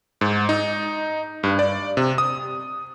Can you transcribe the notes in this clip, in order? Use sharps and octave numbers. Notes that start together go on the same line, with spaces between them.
G#2
D#4
G2
D5
C3
D#6